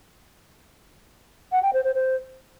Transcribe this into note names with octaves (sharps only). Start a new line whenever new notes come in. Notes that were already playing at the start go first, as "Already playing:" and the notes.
F#5
G5
C5
C5
C5